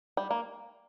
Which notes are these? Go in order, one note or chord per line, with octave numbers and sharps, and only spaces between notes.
G3
A#3